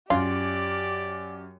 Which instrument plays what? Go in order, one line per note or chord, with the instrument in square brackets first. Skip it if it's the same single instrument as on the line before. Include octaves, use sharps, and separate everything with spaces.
[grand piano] F#2 [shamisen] F4 [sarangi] G4 [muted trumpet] D5